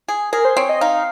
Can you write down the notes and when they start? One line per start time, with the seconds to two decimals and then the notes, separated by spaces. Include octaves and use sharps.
0.08 G#4
0.33 G#4 A#4
0.45 C5
0.57 C4 C#5
0.69 D#5
0.81 D#4 F5